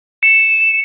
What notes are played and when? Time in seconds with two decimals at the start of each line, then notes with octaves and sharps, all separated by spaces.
0.23 C#7 E7